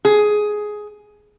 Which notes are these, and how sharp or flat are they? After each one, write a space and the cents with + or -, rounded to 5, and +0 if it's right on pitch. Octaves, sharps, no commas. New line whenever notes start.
G#4 +10